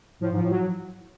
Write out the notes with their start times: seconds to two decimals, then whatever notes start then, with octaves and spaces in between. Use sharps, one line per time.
0.21 A2 F3
0.32 G#2 F3
0.43 A2
0.51 F#3